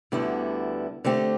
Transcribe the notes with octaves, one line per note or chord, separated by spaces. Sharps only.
D2 D3 G3 B3 E4
D3 A3 C4 G4